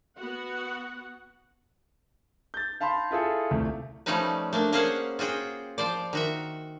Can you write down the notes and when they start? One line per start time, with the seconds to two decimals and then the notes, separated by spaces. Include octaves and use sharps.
0.17 B3 F#4 F#5
2.54 G6 A6
2.81 F5 A5 B5 C6
3.11 E4 F4 G#4 A4
3.51 C2 A3
4.06 F3 G3 A3 C#4 D#4 B4
4.53 A3 A#3 D4
4.72 A#3 C#4 G#4 C5 F5 F#5
5.19 F4 F#4 G#4 G5
5.78 F3 C5 D5
6.13 D#3 F#4 E5